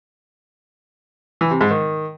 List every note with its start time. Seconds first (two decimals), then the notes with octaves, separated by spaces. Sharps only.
1.41 E3
1.51 C3
1.61 G#2
1.71 D#3